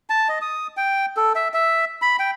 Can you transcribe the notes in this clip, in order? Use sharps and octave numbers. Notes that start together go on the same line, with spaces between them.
A5
D#5
D#6
G5
A4
E5
E5
B5
G5